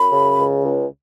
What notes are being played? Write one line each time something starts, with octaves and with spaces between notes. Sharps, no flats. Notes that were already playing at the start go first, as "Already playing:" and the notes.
Already playing: F#2 B5
C#3
C#2
C#2